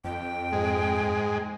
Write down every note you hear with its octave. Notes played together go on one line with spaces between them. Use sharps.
F2 G5
G#2 G#3